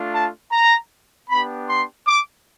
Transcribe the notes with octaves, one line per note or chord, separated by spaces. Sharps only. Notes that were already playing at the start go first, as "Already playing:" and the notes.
Already playing: A3 D4 F4
A5
A#5
B3 D4 G4 B5
C6
D6